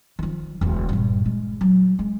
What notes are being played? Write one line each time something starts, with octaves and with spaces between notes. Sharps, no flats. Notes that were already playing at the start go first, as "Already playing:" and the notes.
D#3 F3
E1 D2
G2 A#2
G#3
F#3
G#3